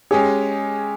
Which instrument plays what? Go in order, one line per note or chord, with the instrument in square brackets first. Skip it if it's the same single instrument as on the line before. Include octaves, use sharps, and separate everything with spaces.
[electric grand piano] G#3 C#4 G4 C#5 [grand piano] G#4